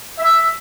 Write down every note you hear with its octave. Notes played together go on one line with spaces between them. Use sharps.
E5